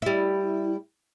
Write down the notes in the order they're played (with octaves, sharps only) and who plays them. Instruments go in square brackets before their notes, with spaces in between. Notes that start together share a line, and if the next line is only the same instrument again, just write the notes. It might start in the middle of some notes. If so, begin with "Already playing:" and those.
[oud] G3 E4